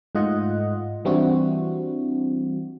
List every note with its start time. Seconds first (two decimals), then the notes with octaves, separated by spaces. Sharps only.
0.15 G#2 A3 F4 D#5 F#5
1.05 E3 G3 C4 D4 E4 F#4